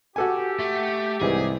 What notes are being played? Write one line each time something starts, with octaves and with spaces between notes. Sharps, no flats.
F#4 G4 A4 G#5
A3
C2 G#2 E3 G#4